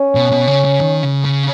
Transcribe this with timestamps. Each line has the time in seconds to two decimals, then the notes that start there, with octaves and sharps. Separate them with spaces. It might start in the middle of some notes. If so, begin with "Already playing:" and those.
Already playing: C#4
0.15 B2
0.32 B2
0.48 C#3
0.65 C#3
0.81 D#3
1.03 C#3
1.24 C#3